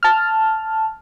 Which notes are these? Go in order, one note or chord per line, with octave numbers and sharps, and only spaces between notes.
A5 F6